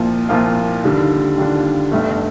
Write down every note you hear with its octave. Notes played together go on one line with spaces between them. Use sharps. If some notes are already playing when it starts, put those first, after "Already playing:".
Already playing: C2 A#2 F3 A#3 F4
C2 A#2 F3 A#3 F4
D#2 D3 G3 D4 F4
D#2 D3 G3 D4 F4
G1 G2 D3 A3